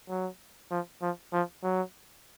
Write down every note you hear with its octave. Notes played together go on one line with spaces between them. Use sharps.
F#3
F3
F3
F3
F#3